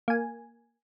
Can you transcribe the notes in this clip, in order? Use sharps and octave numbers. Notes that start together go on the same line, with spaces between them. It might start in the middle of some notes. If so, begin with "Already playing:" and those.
A#3 G#5